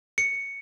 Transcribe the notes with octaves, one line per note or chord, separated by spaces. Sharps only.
C#7